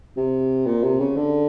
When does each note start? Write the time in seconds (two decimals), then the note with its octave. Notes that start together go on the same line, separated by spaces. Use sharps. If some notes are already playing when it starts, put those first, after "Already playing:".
0.16 C3
0.66 A#2
0.83 C3
1.00 C#3
1.16 D3